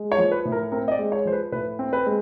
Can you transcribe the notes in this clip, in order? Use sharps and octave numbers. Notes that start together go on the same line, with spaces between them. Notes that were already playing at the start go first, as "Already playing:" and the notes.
Already playing: G#3
C#5
F3
B4
A2
A#4
C4 A#4
D#5
D5
G#3
C#5
F3 C5
B4
A2 B4
C4
B4
G#3